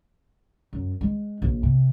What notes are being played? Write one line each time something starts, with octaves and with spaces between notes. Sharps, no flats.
F#2
G#3
A#1
C3